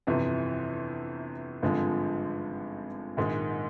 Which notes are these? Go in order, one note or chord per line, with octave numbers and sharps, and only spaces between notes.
G1 F2 C3 E3
G#1 G2 D3 F3 G#3
A#1 G#2 D#3 G#3